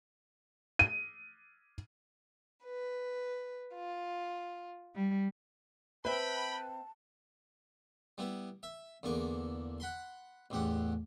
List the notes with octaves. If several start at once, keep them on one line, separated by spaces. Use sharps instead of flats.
D#7
B4
F4
G3
C4 B4 E5 G5 A5 B5
G3 B3 E4
E5
E2 D3 A#3 C#6 D6
F#5 B5 C6
A1 E2 G4 F#5